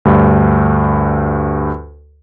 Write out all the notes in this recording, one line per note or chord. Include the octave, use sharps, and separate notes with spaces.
D2 G2